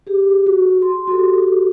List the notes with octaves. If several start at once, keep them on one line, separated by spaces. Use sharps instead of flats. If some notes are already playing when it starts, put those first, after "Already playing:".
G4 G#4
F#4
C6
F#4 G4 A4